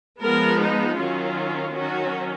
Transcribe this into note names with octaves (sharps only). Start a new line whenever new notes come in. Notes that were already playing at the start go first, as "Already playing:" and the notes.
F3 G#3 B3 A#4
D#4
D#3 F#3 C#4 F4
D#3 F#3 C#4 F#4